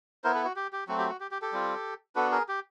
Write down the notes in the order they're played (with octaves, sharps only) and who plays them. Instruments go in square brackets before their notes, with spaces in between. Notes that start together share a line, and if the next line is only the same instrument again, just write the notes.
[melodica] B3 E4 A#4 C5
A4 B4
F#4
G4
G4
F#3 A3 C4 F#4
G4
F#4
G4
G4
G4 A4
G3 C4 F4
B3 D4 F#4 A4 B4
G#4 A#4
G4